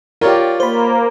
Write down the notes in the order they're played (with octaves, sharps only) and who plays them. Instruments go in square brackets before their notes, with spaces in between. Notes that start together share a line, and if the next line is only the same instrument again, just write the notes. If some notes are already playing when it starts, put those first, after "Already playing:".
[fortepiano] F4 C#5 D5 [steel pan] G4 A#4
[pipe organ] A#3 [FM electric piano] C5 B5